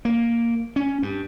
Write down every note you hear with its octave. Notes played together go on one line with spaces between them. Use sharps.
A#3
C#4
G2